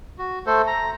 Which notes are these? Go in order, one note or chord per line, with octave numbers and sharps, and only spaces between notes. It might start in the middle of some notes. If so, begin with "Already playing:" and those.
F#4
A3 A4 C5
A#5